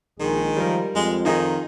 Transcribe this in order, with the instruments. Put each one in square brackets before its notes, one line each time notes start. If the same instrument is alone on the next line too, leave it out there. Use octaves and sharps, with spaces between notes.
[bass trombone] A#1 [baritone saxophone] D#3 [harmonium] G#3 G#4
[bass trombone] F3 [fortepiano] G3 A#4
[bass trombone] F2 [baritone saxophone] G#3 [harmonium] F4
[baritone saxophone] D#3 [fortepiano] D#4 G#4 D#5